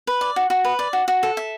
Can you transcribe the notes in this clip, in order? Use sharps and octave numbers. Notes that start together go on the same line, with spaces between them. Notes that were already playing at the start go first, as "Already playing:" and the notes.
B4
D5
F#4
F#4
B4
D5
F#4
F#4
A4
E5